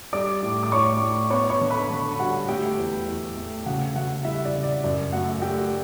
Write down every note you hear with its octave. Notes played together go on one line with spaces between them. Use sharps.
G3 D5 D6
A2
D6
A2 C#5 C#6
A2
B3 C#5 C#6
C#5 C#6
D3
B4 B5
D3
G3 F#4 F#5
A3 G4 G5
E2
E2
A3
C#3 F#4 F#5
C#3 F#4 F#5
G3 E4 E5
D5
C#3
D5
F#2 D5
A3 F#4 F#5
A3 G4 G5